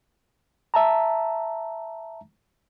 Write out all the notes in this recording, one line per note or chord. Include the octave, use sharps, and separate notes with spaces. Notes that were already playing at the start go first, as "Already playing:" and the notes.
E5 A5 A#5